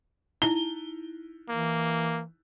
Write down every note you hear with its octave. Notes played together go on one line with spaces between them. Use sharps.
D#4 E4 G7
E3 A#3